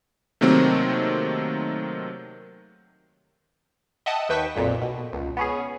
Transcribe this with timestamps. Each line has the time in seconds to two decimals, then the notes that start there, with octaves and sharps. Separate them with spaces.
0.41 C3 D#3 F#3 A3 A#3 C4
4.06 D#5 E5 F#5 G5 A5 D#6
4.29 D#2 B4 G5 C#6 B6 E7
4.56 B1 F2 A#2
4.82 B2
5.13 C#2
5.37 B3 C#4 G#4